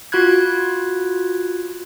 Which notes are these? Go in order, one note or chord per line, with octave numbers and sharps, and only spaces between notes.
F4 F#4 B5 F#6 G#6